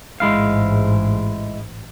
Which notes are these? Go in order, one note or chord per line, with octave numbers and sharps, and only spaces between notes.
A1 G#2 G#3 E4 F5